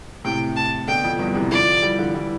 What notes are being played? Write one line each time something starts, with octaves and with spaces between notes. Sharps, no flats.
A2 C3 G5
A5
B2 D3 G5
F2
E2 G2
C3 E3
D3 F3 D5
E3 G3
D3 F3
E3 G3